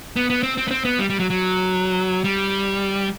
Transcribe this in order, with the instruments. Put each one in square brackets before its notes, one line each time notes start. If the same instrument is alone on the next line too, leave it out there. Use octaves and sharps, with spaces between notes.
[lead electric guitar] B3
B3
C4
C4
B3
C4
B3
G3
G3
F#3
F#3
G3